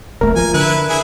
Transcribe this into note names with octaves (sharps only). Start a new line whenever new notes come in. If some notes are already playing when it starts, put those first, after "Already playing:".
D1 G#1 A3 A#4
F3 G#5
D3 E4 B4
E4 G#4 G#5